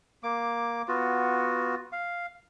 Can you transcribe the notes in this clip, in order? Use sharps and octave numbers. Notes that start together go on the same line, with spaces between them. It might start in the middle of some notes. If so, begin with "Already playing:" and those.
A#3 D6
B3 F4 F#4
F5